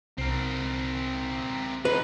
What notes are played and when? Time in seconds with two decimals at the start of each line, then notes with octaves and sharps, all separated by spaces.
0.18 C2 C4 A#4
1.85 G2 D#4 B4